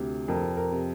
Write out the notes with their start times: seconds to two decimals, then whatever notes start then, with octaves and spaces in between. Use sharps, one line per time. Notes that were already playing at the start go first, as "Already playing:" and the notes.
Already playing: D2 C3
0.28 F2 A#4
0.57 A#4
0.71 C3